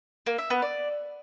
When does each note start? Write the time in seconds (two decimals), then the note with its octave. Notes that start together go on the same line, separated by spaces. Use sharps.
0.26 A#3
0.38 E5
0.50 B3
0.62 D5